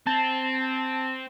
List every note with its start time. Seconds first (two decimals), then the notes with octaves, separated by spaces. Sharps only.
0.07 C4 A5